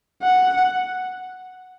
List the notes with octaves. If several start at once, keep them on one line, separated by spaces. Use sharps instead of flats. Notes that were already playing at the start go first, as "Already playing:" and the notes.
F#5